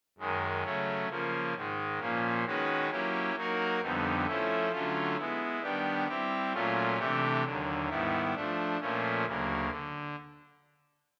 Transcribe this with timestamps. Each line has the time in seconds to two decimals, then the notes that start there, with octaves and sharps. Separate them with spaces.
0.18 F#2 D#3 G#3
0.63 C#3 F#3 A3 C#4
1.09 C#3 F3 A#3 C#4
1.54 G#2 D#3 G#3
2.00 A#2 F3 A#3 C#4
2.44 D#3 G#3 C#4 F#4 B4
2.90 F#3 A#3 C#4 E4 G4
3.35 F#3 A#3 D#4 F#4 A#4
3.81 F2 D3 G3 B3 D#4
4.26 F3 A3 C#4 E4 A4
4.71 D3 F#3 A3 C#4 F4
5.17 G#3 B3 E4
5.62 D#3 G3 B3 D4 G4
6.08 G3 C4 E4 G4
6.53 A#2 F#3 A3 C#4 F4
6.98 C3 E3 A3 D4 G4
7.44 D#2 D3 F#3
7.89 G#2 D#3 G3 B3 E4
8.34 F3 A3 D4
8.80 A#2 F3 A3 C#4
9.25 D2 C#3 F#3 A#3
9.70 D3